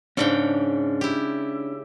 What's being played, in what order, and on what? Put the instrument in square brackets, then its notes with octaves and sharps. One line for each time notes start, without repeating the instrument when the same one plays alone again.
[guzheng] G#2 C#3 G5 [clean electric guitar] C#4 D4
[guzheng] E4 G4